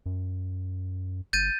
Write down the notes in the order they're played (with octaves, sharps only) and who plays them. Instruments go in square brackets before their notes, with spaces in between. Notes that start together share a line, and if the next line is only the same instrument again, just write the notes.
[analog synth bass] F#2
[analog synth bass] G1 [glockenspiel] G6 A6 D#7